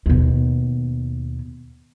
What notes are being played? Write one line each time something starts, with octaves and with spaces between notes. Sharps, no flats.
D#2 B2